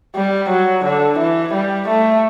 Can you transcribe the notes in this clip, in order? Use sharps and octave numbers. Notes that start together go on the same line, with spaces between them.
G3
F#3
D3
E3
G3
A3